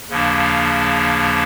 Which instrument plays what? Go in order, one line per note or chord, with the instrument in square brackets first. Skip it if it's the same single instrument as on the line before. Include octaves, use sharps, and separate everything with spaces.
[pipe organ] D#2 C#3 F3 A#3 D4